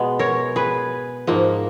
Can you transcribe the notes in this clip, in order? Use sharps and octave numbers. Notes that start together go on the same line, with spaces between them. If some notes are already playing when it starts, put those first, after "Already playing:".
Already playing: B2 G#3 B3
A#4 C#5
G#4 B4
G#2 F3 A#3